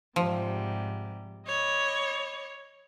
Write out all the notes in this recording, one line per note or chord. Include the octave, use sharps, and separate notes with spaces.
G#2 C3 F3 G3
C#5 D#5 B5 D6